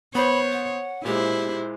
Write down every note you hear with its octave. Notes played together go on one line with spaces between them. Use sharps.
B3 C5 C#5 B5
F#5
A#2 G#3 E4 G4 C5